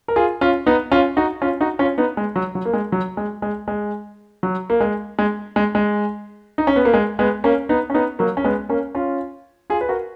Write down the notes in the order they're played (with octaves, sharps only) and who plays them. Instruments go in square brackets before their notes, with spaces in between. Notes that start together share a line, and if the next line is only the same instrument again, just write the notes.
[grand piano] A#4
F4 G#4
C#4 F4
B3 D#4
C#4 F4
D#4 F#4
C#4 F4
D#4 F#4
C#4 F4
B3 D#4
G#3
F#3
F#3
A#3
G#3
F#3
G#3
G#3
G#3
F#3
A#3
G#3
G#3
G#3
G#3
D#4
C#4
B3
A#3
G#3
G#3 B3
A#3 C#4
B3 D#4
C#4
B3 D#4
F#3 A#3
C#4
G#3 B3
A#3 C#4
C#4 F4
F4 G#4
B4
F#4 A#4